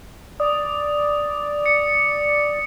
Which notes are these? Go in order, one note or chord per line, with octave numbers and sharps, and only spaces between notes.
D5 D#6
C#7